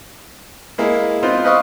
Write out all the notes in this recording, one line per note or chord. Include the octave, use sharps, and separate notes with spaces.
G#3 A#3 E4
B3 C4 D#4 F4 C5
B4 C5 D#5 F5 C#6 D#6